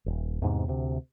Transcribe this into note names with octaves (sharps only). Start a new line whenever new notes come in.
D#1
E2 G#2 C3
D2 C3